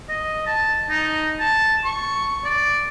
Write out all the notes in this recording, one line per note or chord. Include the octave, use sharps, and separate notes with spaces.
D#5
A5
D#4
A5
C#6
D5